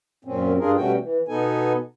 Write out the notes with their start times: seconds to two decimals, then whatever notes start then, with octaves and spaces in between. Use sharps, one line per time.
0.25 F#2 A#2 C4 C#4
0.59 G2 D4 F4 G#4 A#4
0.76 B2 G3 A3 C#4 F#4 G5
1.00 E3
1.28 B2 B3 D#4 A4 G#5